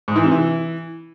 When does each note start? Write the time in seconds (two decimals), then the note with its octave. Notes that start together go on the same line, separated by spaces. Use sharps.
0.08 G#2
0.16 E3
0.24 C3
0.32 E3